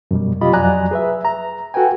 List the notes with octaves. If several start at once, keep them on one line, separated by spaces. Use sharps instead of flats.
F#2 B2 G3
C3 F#3 F4 G4 D#5 B5
F2 F#3 D5 G#5 A#5 F#6
G#4 B4 E5
A#5
F#4 A4 B4 G5 G#5